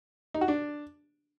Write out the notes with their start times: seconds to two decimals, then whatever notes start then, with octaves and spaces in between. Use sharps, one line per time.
0.34 D#4
0.41 F#4
0.48 D4